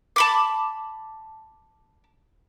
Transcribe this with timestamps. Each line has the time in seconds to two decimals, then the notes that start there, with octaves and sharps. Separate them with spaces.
0.16 A5 B5 D6